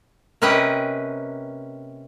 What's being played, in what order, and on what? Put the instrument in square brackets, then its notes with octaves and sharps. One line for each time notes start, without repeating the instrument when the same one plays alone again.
[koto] C3 A#3 C#4 B4 D#5 G5